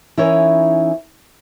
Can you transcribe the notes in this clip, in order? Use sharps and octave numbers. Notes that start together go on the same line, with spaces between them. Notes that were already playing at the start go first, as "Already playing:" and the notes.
E3 C#4 D#4 E4 A#4 C#5